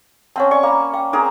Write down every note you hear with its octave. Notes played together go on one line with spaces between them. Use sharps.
C4 C#4 C#5 F#5 A5
D5 G#5 C#6
A#3 F5 B5
F5 G5
C4 D4 G#4 A#4